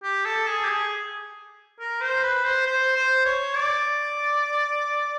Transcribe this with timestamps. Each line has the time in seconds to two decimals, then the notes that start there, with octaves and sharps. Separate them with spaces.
0.03 G4
0.25 A4
0.47 G#4
0.64 G4
0.70 G#4
1.79 A#4
2.01 C5
2.23 B4
2.44 C5
2.66 C5
2.96 C5
3.25 C#5
3.55 D5